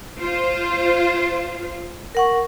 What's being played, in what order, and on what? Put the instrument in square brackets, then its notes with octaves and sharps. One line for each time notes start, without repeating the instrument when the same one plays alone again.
[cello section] F4 C5
[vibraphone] A#4 F#5 C#6